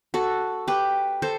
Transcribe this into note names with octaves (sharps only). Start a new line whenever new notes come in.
F#4 A4
G4 B4
A4 C5